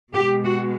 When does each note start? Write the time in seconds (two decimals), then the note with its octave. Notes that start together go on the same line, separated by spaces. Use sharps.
0.14 B2 G#3 G4
0.43 F#4